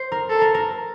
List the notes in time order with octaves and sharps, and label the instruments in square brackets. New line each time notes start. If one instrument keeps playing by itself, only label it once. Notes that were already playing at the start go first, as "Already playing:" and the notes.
Already playing: [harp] C5
A#4
[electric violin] A4
[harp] A#4
A#4